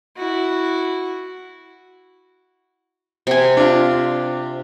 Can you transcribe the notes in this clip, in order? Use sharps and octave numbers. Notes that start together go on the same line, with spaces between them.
E4 F#4
C3 G#5
D4 F4